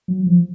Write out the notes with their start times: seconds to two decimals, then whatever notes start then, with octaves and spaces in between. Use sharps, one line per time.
0.08 F#3
0.27 F3